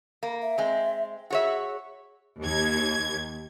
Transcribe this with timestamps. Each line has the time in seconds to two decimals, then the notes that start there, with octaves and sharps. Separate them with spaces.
0.23 A#3
0.42 E5
0.58 G#3 C4
1.30 F#4 G#4 C#5 E5
2.41 D#2 G#6